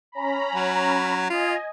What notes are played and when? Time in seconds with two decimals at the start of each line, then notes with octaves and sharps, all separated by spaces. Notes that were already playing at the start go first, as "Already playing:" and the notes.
0.12 C#4 A#5 B5
0.55 F#3
1.30 F4 D#5 G#5